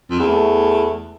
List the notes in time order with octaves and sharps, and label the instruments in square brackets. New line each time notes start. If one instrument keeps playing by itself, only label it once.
[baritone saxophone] F2
E2
[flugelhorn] A3